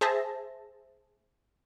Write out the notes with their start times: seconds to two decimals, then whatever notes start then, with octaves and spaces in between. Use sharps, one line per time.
0.01 G#4 C5 E5 A5 A#6